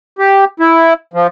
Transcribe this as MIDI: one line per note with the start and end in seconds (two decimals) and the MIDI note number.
0.19 0.45 67
0.60 0.94 64
1.13 1.27 53